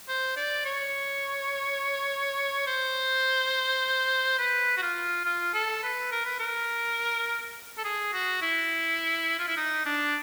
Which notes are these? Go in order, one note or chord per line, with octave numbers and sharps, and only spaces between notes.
C5
D5
C#5
C5
B4
F#4
F4
F4
A4
B4
A#4
B4
A#4
A4
G#4
F#4
E4
F4
E4
D#4
D4